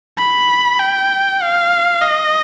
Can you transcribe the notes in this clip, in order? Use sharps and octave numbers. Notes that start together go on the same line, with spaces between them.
B5
G5
F5
D#5